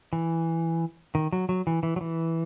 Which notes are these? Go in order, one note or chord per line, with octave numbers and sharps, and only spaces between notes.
E3
D#3
F#3
F#3
E3
E3
F#3
E3